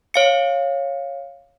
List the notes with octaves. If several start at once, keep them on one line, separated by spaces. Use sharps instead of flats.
C#5 F5 C#7